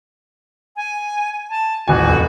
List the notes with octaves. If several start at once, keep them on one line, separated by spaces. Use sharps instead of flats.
G#5
A5
D#1 A1 F#4 G#5
F1